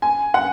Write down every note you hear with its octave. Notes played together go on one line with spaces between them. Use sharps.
G#5
F#5